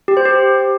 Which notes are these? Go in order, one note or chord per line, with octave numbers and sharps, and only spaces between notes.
G4
C5
G4